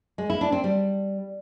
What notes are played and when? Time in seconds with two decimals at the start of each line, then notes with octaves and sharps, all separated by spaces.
0.18 G#3
0.30 E4
0.41 D4
0.52 C4
0.64 G3